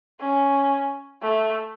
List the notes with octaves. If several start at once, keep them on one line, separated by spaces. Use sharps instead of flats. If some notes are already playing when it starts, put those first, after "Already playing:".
C#4
A3